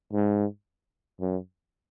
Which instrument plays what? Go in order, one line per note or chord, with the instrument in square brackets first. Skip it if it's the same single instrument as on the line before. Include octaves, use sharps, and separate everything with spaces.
[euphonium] G#2
F#2